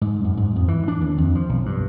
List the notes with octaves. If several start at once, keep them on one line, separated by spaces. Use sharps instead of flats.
G#2
F#2
G#2
F2
E3
D4
D#2
F2
F3
B1
G2